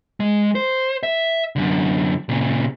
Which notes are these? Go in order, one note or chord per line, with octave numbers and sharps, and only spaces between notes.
G#3
C5
E5
F#2 D3
A#2 C#3